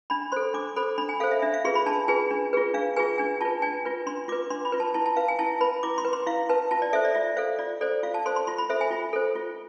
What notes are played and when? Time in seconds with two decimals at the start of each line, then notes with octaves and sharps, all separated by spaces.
0.10 D4 B5
0.32 A4 C5 C6
0.54 D4 D6
0.76 A4 C5 B5
0.98 D4 B5
1.09 G#5
1.20 A4 C5 F5
1.31 E5
1.42 D4 E5
1.54 F5
1.64 F4 G#4 B4 C6
1.75 B5
1.86 D4 A5
2.08 F4 G#4 B4 G#5
2.31 D4
2.53 F4 G#4 B4
2.74 D4 F5
2.96 F4 G#4 B4 G#5
3.18 D4 G#5
3.41 F4 B4 A5
3.62 D4 G#5
3.85 F4 B4
4.06 D4 C6
4.28 F4 D6
4.32 B4
4.50 D4 C6
4.65 B5
4.72 F4 B4
4.80 A5
4.94 E4 A5
5.06 A5
5.17 B4 F5
5.28 G#5
5.39 E4 A5
5.61 B4 B5
5.83 E4 D6
5.98 C6
6.05 B4
6.13 C6
6.26 E4 F5
6.49 B4 A5
6.71 F4 A5
6.82 D5
6.93 A4 C5 E5
7.05 D5
7.15 F4 E5
7.37 A4 C5 F5
7.59 F4 D5
7.81 A4 C5 D5
8.03 F4 F5
8.14 A5
8.26 A4 C5 C6
8.36 C6
8.47 F4 C6
8.58 B5
8.69 A4 C5 E5
8.81 G#5
8.91 F4
9.13 A4 C5
9.36 F4